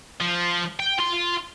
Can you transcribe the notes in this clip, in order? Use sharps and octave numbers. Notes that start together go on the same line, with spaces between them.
F3
G5
F4 C6